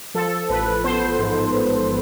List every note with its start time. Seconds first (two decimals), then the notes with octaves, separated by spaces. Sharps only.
0.15 F3 A4
0.49 A1 B4
0.84 B3 C5
1.19 G#2